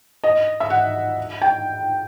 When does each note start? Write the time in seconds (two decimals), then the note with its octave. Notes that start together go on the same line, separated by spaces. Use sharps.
0.24 D#5
0.60 E5
0.70 F#5
1.42 G5